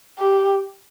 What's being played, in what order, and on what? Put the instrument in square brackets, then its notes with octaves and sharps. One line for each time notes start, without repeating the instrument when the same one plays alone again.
[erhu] G4